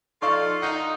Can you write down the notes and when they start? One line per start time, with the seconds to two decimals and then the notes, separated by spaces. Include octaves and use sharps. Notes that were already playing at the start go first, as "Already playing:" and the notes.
0.22 D#4 F4 A4 D5 F5 C#6
0.62 D#4 F#5